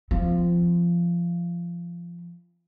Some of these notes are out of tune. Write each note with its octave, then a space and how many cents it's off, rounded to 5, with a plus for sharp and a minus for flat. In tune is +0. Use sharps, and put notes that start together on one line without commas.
F3 -20 C4 -35